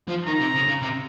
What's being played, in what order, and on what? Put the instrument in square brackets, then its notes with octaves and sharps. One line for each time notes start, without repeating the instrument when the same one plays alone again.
[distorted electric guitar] F3
[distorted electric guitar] D#3 [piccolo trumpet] A#5
[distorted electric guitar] C3
C#3
C#3
C3